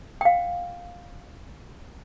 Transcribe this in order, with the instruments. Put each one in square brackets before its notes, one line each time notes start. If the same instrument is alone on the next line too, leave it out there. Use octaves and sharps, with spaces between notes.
[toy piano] F5 G5